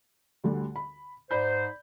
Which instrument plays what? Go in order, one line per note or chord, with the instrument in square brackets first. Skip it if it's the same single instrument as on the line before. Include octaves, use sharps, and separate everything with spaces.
[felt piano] D2 D3 G3
B5
[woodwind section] G#2 D#4 C5 [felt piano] D5 B5 G6